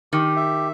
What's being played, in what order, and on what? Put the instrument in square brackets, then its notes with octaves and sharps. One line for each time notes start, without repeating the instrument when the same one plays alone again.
[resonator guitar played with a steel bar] D#3 [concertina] G4
[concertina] E5